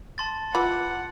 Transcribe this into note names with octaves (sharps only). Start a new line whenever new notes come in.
A5 C6 A6
E3 F4 F#5 B5 D6